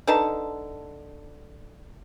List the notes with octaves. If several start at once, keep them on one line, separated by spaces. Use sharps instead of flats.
D3 D#4 B4 A5